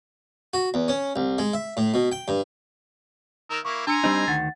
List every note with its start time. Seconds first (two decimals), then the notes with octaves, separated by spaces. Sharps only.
0.54 F#4
0.74 E2
0.88 C#4
1.16 C2
1.38 G#3
1.54 E5
1.77 A2
1.94 B2
2.12 G5
2.28 G2
3.50 D#3 A#4 E6
3.65 A#3 E4 C#6
3.87 D4 G#5 A#5 C6 E6 C#7
4.04 G3 C4 D4 D#4 D#5 E6
4.27 D2 D#3 F#5 A6